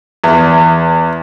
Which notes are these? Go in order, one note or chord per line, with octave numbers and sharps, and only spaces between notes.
E2